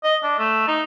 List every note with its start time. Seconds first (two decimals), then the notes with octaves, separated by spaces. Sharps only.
0.04 D#5
0.23 D4
0.39 A3
0.68 D#4